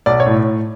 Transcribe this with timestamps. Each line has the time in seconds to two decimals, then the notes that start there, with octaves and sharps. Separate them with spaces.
0.06 B1 D5
0.20 C#5
0.26 A2